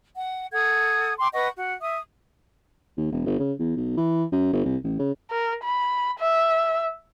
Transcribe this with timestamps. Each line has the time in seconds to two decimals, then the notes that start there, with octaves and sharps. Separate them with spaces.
0.15 F#5
0.53 A4 F#5 D#6 G#6
1.19 G5 C6 D6
1.33 B4 D#5 F#5 C#6
1.56 F#4
1.81 E5 D#6
2.97 D#2
3.12 E1
3.26 G1
3.39 C#3
3.59 E2
3.76 B1
3.97 E3
4.32 F#2
4.53 G1
4.65 C2
4.84 A1
4.99 C#3
5.31 A#4
5.64 B5
6.19 E5